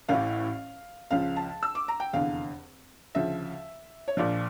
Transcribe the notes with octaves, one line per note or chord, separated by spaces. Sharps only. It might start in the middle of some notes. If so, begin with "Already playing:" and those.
A1 A2 E3 F5
C#2 C#3 F3 F5
A5
E6
D6
A#5
G5
F1 E2 D3 F5
D2 C#3 F3 E5
C#5
A#1 A#2 F3 D5